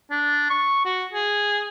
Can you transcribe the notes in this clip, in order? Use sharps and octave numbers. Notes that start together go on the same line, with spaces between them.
D4
C#6
F#4
G#4